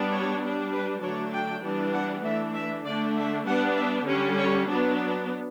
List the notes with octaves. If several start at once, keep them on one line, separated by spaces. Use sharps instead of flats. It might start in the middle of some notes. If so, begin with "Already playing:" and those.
Already playing: G3 B3 D4
C#5
G3 D4
B4
D3 F#3 A3 D4 C#5
G5
E3 G3 B3 D4
F#5
E3 A3 D4 E5
E5
D3 A3 D4 D5
E5
G3 B3 D4 F#5
E5
D3 G3 C#4 C#5
C#5
F#3 B3 D4